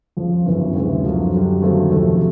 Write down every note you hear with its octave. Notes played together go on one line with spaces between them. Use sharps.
F2 C#3 F3
G1 F#2 C#3 E3
D2 C3 E3 G#3 C#4
F#2 D3 F3
F#2 D3 G3
D#2 D3 F#3 A3 C4
F2 C3 D#3 F#3 A3